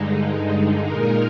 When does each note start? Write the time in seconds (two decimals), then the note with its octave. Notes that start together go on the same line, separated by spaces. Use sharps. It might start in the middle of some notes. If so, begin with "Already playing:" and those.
Already playing: G2 D3 G#3 D#4
0.84 A#2 G#3 D#4 A#4